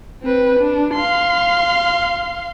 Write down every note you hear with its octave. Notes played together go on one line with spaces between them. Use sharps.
C4 B4
D4
F5 C6